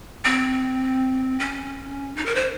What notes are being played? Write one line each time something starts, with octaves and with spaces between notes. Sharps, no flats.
C4
C#4
D#4
A#4
C5